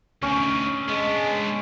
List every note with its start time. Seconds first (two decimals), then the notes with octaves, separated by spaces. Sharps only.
0.23 D2 D#3 C#4
0.88 G#3 B3 D4